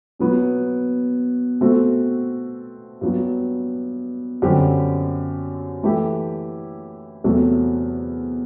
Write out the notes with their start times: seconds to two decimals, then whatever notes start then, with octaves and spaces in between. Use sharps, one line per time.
0.19 B2 F#3 B3
1.61 B2 A3 C4 F#4 A4
3.01 G2 F#3 B3
4.42 F#2 D3 G3 C4 G4
5.83 E3 A3 E4 G4
7.24 E2 C3 F#3 A3